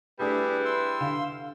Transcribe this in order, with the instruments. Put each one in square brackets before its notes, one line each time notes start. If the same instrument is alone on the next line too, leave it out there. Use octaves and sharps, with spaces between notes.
[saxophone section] G3 E4 [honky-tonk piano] A3 D4 [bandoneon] G4 G#4 [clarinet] B4
[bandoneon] C6 E6
[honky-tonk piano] D3 F5 E7